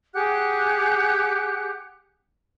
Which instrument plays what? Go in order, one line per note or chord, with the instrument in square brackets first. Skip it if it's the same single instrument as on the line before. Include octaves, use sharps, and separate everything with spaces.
[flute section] G4 G#4 F#5 F#6